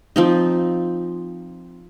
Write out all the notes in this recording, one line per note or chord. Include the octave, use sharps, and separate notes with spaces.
F3 C4 D#4